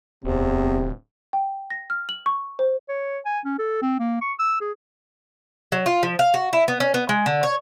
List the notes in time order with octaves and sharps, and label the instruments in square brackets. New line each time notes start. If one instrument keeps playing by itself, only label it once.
[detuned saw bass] D1 [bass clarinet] E2 [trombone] C3 [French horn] C4
[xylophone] G5
A#6
F6
F#7
C#6
C5
[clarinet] C#5
G#5
C#4
A4
C4
A#3
C#6
E6
G#4
[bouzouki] F#3
F4
F3
F5
F#4
E4
B3
C#4
B3
G#3
D3
C#5